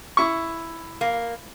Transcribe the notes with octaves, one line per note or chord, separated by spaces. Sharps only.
E4 C#6
A#3